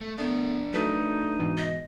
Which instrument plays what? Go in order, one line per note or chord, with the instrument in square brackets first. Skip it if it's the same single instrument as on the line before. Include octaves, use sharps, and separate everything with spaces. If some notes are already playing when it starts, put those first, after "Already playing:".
[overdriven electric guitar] A3
[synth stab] A3 [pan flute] B3 [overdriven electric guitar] D4 A#4
[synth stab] F#3 A4 B4 [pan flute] A3 [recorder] D#4
[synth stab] G#2 B2 E3
[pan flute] D#5